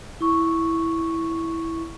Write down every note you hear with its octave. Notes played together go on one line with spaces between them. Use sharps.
E4 C#6